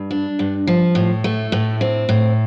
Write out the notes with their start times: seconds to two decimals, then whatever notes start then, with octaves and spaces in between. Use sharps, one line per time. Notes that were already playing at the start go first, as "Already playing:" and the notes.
Already playing: G2
0.11 D4
0.39 G2
0.67 F3
0.95 A2
1.24 A3
1.52 A2
1.81 C4
2.09 A2